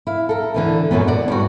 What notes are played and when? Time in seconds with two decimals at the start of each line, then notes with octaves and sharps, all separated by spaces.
0.07 E4 F5
0.29 A4 A#4
0.54 D3 E3 D#4
0.91 F#2 A#2 F#3 B3
1.07 D5 F#5
1.28 G2 G3 F#4